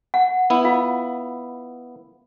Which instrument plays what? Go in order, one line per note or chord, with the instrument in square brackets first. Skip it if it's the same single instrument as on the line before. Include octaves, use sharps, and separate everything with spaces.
[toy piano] F#5
[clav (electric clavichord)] B3 E4
[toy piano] F4 F5